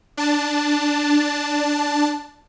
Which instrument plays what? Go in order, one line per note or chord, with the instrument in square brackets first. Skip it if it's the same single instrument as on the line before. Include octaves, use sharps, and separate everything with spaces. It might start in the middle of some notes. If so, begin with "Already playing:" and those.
[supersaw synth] D4 A5